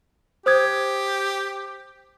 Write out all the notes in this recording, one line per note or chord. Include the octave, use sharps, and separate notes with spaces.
G4 C5 D#6 G#6